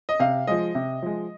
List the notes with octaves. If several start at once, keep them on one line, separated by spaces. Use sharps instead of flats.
D#5
C3 F5
F3 G#3 D#5
C3
F3 G#3